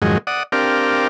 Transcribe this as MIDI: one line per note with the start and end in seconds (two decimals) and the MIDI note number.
0.02 0.18 41
0.02 0.18 44
0.02 0.18 51
0.02 0.18 54
0.02 0.18 56
0.27 0.43 74
0.27 0.43 78
0.27 0.43 87
0.52 1.08 60
0.52 1.08 62
0.52 1.08 67
0.52 1.08 70
0.52 1.08 74
0.52 1.08 77